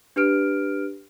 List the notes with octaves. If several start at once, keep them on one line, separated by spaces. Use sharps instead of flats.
D4 G4 B4 F6 D7